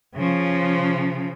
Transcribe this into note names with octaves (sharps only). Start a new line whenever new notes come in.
C#3 F3